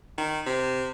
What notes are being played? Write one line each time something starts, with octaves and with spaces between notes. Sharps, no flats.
D#3
C3